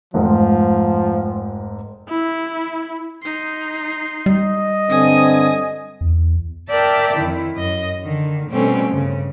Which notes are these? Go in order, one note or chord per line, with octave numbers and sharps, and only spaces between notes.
F1 G#2 F3
E4
D#4 C6
G3 D#5
G2 D3 C4 G#5 D#6
E2
A#4 D5 E5 G5 A5 A6
F2 D#3 E4
F#2 D#5
D3 D#3
B2 G3 A3 C4 C#4
G2 C#3